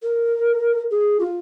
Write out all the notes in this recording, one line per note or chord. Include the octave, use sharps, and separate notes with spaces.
A#4
G#4
F4